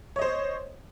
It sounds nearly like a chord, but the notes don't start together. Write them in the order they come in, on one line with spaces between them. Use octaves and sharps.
C#5 D#5 C5